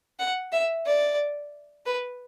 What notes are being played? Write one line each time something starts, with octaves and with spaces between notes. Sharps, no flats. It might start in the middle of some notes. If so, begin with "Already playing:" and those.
F#5
E5
D5
B4